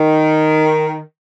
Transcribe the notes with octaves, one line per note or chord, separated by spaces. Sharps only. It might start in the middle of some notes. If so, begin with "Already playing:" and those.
Already playing: D#3